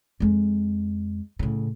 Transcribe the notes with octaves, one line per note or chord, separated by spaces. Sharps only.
F2 G#3
A2 C#3